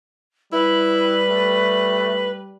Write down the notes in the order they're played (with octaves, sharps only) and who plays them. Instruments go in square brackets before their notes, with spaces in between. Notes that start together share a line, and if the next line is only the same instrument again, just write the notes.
[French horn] G3 [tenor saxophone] E4 [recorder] B4
[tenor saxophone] A3